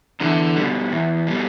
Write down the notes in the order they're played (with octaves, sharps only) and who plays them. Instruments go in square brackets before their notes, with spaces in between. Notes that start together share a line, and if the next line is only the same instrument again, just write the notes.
[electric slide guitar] E2 [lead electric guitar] D3
[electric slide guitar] B2 G3
E2
B2 G3